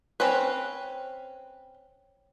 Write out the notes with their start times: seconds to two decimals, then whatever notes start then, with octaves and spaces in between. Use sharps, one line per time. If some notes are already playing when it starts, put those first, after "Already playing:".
0.20 C4 C#4 B4